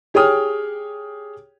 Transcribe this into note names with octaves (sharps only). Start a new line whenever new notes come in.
G4 G#4 C#5 G5 D#6 F6